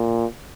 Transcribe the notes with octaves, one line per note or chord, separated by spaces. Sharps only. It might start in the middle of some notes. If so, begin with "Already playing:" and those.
Already playing: A#2